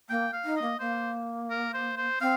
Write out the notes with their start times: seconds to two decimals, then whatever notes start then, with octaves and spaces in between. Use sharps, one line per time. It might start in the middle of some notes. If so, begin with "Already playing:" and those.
0.09 A#3 G5
0.33 F5
0.44 D#4
0.56 D#5
0.62 A#3
0.80 A#3 C5
1.50 A#4
1.74 C5
1.97 C5
2.21 C4 F5